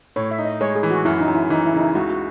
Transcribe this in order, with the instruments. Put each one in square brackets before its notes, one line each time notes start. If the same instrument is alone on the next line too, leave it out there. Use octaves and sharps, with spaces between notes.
[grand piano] A2 [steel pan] C#5
[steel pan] E5
[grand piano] D#4
[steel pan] D#5
[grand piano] G#3 [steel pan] C#5
[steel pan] G#4
[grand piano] E3
[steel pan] F#4
[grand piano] F#2 [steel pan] E4
[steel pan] D#4
[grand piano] F#2
[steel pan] E4
[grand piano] E3 [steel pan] D#4
[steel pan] E4
[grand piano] C#3 [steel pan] D#4
[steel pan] E4
[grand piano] C#2 [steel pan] F#4
[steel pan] F#4